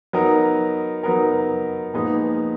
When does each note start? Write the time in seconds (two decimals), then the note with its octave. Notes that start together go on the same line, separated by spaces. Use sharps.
0.13 F#3 B3 D#4 A#4
1.03 F#3 B3 D#4 A#4
1.94 A#2 F3 G#3 B3 D#4